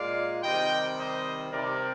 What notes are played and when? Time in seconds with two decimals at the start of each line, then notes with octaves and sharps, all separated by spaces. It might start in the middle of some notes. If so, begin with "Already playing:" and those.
Already playing: A#2 G#3 D5 F5
0.43 C3 D#3 G3 D#5 G5
0.98 C5 D#5
1.53 C3 G3 A#4 D5